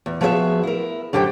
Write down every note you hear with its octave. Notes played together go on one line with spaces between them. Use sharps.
E2
F3 B3 F#4 G#4 D#5 E5
E4 A#4
F#2 D3 G4 C5 G5